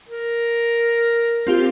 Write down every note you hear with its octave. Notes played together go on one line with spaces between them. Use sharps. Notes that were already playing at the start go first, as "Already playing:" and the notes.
A#4
C4 F4 G4